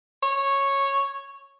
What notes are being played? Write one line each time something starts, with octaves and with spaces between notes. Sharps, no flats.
C#5